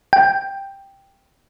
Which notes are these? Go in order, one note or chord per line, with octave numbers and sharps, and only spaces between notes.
G5